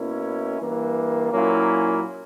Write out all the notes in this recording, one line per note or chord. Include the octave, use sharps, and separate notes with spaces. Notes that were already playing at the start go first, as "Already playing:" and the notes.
Already playing: B2 A#3 C#4 E4
G2 E3 A#3
A#2 F#3 A#3 C#4 E4